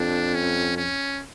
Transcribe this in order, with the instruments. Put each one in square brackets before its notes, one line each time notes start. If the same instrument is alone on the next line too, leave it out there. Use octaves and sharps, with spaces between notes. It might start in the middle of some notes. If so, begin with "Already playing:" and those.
Already playing: [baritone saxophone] F2 [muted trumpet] D4
[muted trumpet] C#4
C#4